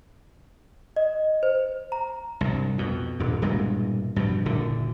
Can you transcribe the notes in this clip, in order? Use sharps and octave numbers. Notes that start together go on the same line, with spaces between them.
D#5
C5
A#5
C2 G2
F2 B2
D#1 G2
E1 G2 A#2 G#3
G2 B2 F3
F#1 A#2 D3